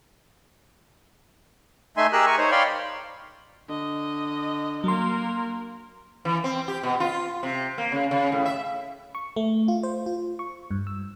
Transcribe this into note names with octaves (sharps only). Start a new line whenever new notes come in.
A3 D#4 E5 G#5 C6
G4 G#4 A#4 E6 F#6
A#4 G#5 C#6
D#4 C5 C#5
C#5 D5 F5 G5 B5 C6
D3 D#5
F#3 A#3 A#4 C6
E3
C4
G4
B2
F4
C3
A#3
C#3
C#3
A2
E5
C#6
A3
F4
C5
F4
C#6
G2
E6